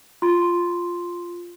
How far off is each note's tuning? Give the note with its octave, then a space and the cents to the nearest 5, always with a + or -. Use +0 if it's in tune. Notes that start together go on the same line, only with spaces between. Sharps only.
F4 +0 C6 +0